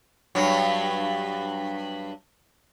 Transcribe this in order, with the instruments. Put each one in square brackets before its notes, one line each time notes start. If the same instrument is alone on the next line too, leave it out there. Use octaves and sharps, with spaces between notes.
[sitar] G2 F#3